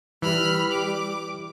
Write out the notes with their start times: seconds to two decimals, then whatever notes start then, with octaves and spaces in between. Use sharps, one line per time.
0.22 E3 G3 B5 F6
0.71 D6